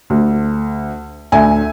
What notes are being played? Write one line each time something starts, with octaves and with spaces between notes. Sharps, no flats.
D2
D2 E5 G#5